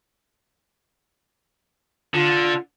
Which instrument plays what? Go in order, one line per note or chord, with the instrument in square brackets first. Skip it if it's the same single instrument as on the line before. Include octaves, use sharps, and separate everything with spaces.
[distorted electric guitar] D3 [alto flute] F4